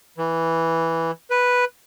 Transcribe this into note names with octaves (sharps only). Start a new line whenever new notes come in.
E3
B4